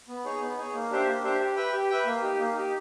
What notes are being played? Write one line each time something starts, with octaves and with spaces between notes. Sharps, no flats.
B3
D#4 G#4 C#5
B3
D#4 G#4 C#5
A#3
D4 G4 C5 E5
A#3
D4 G4 C5 E5
G4
B4 E5 G5
G4
B4 E5 G5
A#3
D#4 G4
A#3
D#4 G4